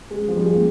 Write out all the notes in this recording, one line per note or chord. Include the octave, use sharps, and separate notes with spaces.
G#3
F3
G3
G#3
A#3